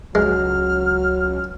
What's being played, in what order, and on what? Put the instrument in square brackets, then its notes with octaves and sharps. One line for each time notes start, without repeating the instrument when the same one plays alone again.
[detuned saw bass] C#2 [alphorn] F#3 [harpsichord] G#3 [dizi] F6